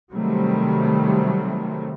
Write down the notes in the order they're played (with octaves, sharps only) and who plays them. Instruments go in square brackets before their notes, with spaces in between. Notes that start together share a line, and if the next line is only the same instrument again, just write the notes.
[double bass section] C3 D#3 F#3 G3 A3 C4